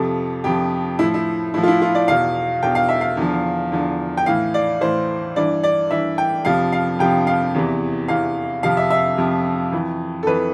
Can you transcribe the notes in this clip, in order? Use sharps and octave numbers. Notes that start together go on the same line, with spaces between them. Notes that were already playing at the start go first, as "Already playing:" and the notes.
Already playing: F2 C3 F3 A4
F2 C3 F3 G4
A2 F3 E4
E4
A2 F3 E4
F4
E4
F4
D5
E2 B2 F5
E2 B2 G5
F5
E5
F5
E2 D3 F3
E2 D3 F3
G5
A2 E3 F5
D5
A2 E3 C5
G2 E3 D5
D5
G2 E3 E5
G5
F2 C3 F3 F5
F5
F2 C3 F3 G5
F5
E2 C3 E3
E2 C3 E3 F5
F2 C3 F3 F5
E5
E5
F2 C3 F3
F2 E3
A4
F2 E3 B4